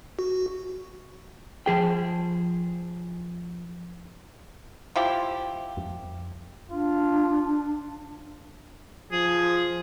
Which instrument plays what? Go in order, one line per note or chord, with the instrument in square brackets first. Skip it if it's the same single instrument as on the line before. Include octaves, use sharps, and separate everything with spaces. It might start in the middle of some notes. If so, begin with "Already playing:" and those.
[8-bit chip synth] F#4
[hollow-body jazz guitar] F3 G#4 G5
[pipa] F3 E4 G4
[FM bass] F2
[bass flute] D4 [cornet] F4
[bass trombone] F3 [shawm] G#4